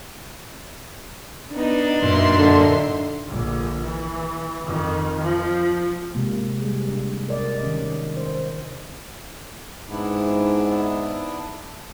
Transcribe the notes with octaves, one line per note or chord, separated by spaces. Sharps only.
B3 D4 D#4
F#2 A#2 D#4 E5 C6
D3
A#1 D3
E3
F2 D#3
F3
C3 G#3 A#3
G3 G#4
C3 D4
A#4 D5 D#5
D#3 C#4
C5
G#2 B3 D4 E4